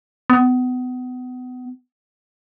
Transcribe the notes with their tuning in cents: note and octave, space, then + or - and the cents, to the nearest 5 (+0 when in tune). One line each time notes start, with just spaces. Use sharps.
B3 +30